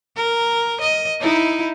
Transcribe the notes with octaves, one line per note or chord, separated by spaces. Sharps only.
A#4
D#5
D#4 E4